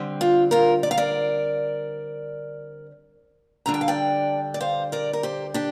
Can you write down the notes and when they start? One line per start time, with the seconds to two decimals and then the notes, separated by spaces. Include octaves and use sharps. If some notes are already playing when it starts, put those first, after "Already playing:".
Already playing: D3 G3 C4
0.21 F4
0.51 F4 A#4
0.83 D5
0.91 F5
0.97 A#4 D5
3.66 D3 G3 D4 A#5
3.74 G5
3.81 F5
3.88 D5 G5
4.54 D5
4.61 C5 F5
4.92 A#4 D5
5.13 A#4
5.23 G4 C5
5.54 D4 G4